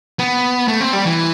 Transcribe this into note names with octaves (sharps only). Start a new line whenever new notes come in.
B3
A3
C4
G3
E3